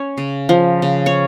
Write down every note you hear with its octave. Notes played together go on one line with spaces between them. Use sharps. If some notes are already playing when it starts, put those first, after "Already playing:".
Already playing: C#4 C#5
C#3
F3
C#3
C#5